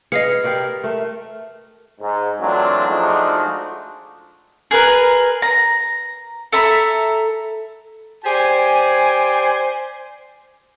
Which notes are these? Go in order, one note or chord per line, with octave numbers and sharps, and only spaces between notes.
G#4 B4 D#5 F5 C7 C#7
G4 A#4 D5
A3 A#4 E5
G#2
E3 F#3 A3 C4 D4 F4
F3 G#3 A3 D4 D#4 F#4
G#4 A#4 B4
A#5
A4 E5 A#5 B5
G4 C5 D5 G#5